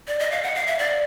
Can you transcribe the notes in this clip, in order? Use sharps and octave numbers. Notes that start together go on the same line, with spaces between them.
D5
D#5
F5
F#5
F5
E5
D5